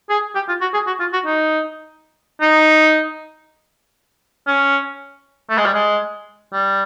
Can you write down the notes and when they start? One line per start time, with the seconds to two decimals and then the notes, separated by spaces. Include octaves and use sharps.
0.10 G#4
0.35 G4
0.48 F4
0.61 F#4
0.74 G#4
0.87 F#4
1.00 F4
1.13 F#4
1.26 D#4
2.41 D#4
4.47 C#4
5.50 A3
5.58 G#3
5.66 G3
5.74 G#3
6.53 G3